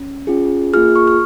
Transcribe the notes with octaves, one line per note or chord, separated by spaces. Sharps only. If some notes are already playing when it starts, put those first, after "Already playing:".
Already playing: C#4
C#4 F4 G#4
A#3 F4 G#4 F6
C#6
F6